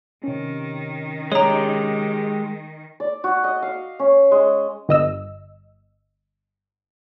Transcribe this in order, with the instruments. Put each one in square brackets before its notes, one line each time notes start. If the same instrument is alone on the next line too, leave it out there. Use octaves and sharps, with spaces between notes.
[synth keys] C3 C#4 [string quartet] D#3
[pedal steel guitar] G#3 G4 [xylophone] C#5 A#5
[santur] D5
F#4
D#5
F5
C#4
G#3
[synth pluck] G1 D#5 E6